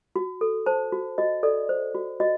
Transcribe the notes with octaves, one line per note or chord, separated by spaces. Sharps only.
F#4
A4
C5 A5
F#4
F#4 D#5
A4 D5
C5
F#4
F#4 D#5